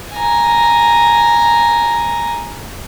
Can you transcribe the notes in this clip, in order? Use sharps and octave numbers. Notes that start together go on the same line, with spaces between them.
G#5 A#5